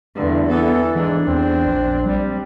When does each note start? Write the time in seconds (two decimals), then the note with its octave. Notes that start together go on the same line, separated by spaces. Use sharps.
0.16 E2 G2 D3
0.50 E3 B3 A4
0.96 G#2 E3 D4
1.28 E2 C4
1.66 A#1
2.06 G3